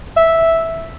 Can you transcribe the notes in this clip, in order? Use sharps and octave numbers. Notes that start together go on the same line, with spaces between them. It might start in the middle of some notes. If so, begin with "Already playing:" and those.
E5